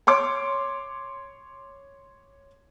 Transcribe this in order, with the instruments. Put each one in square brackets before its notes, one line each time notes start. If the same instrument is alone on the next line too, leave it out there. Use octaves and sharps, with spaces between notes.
[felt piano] C#5 C6 D6